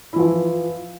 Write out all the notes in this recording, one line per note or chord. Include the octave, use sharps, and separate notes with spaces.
E3 F3 E4